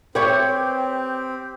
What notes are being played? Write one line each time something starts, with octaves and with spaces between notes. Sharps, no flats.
C4 G4 B4 C#5